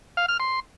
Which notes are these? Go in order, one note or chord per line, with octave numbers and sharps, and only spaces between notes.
F5
F6
C6